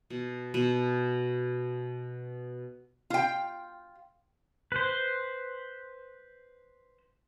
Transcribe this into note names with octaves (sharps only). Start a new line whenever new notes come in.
B2
B2
F4 G5
B4 C5